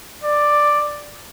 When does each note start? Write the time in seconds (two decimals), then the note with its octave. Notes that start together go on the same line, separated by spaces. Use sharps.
0.23 D5